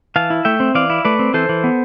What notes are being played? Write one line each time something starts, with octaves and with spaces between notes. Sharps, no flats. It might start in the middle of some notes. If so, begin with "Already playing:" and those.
E3 F5 A5
E4
A3 E5 G5
C4
E3 D5 F5
E4
A3 B4 D5
C4
E3 A4 C5
E3
B3